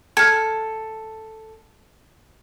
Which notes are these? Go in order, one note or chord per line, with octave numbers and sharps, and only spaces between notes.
A4 F6 G#6